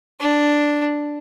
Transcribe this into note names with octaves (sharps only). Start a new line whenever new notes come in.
D4